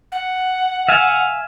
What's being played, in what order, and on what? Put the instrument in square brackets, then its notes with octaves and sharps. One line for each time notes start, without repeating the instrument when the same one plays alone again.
[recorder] F#5
[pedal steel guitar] E5 F5 G#5